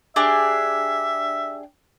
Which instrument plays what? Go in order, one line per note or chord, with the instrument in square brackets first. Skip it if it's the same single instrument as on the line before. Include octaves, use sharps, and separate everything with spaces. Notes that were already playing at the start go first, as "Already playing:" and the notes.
[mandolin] D4 G4 G#4 [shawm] E5